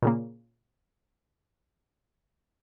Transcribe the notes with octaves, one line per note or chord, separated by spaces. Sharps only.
A#2 C#3 A#3